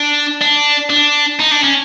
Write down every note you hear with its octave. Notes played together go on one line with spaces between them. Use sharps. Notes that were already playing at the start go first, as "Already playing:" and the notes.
Already playing: D4
D4
D4
D#4
D4
C#4